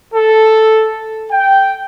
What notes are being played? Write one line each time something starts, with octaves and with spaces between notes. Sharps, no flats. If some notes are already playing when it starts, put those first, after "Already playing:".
A4
G5